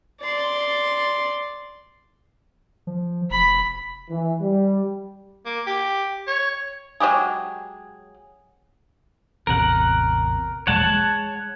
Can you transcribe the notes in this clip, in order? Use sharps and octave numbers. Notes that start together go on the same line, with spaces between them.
D5 C6
F3
F1 B5
E3
G3
A#3
G4
C#5
F#3 G#3 G4 G#4
A1 E2 C3 A#4 F#5
E1 A#1 G#3 C#5 F#5 A5
G#3